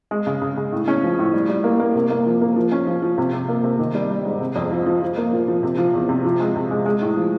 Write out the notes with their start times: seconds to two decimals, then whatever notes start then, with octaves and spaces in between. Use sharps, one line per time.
0.11 G#3
0.27 C#3
0.41 C#3
0.57 C#3
0.72 A2
0.88 C#4
1.03 F3
1.19 A2
1.33 G3
1.49 G3
1.64 A#3
1.80 A#3
1.95 C3
2.10 A#3
2.26 F3
2.41 A#3
2.56 F3
2.72 C#4
2.87 F3
3.02 F3
3.18 C3
3.33 C3
3.49 A#3
3.64 C3
3.79 D#3
3.94 G3
4.10 G3
4.25 G#2
4.40 C3
4.56 F2
4.71 F3
4.86 F3
5.02 F3
5.17 A#3
5.32 A#2
5.48 F3
5.63 C3
5.78 F3
5.94 E2
6.09 C3
6.25 F3
6.40 G#3
6.55 C3
6.71 G#3
6.86 G#3
7.01 A2
7.16 F3